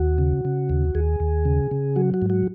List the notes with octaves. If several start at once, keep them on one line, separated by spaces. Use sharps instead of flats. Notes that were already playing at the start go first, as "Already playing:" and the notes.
Already playing: D#2 F#4
C#3
C#3
D#2
D#2 G#4
D#2
C#3
C#3
F#3 F#4
F#4
G#2
F#4